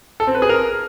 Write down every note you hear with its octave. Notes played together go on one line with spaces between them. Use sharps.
A4
C4
B4
G#4
A#4